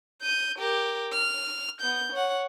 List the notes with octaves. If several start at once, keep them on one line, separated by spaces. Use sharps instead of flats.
G6 D#7
G4 A#4
F6
B3 G6
C#5 F#5